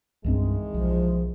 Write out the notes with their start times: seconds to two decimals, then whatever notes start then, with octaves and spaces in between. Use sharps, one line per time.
0.24 C2 G2 D#3 E3 G#3 C4
0.74 B1 F3